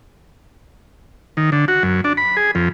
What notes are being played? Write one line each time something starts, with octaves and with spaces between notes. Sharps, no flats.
D#3
D3
F#4
F#2
D4
B5
G#4
F2